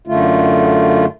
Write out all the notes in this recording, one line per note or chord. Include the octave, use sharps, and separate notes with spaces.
F#2 D3 A3 F4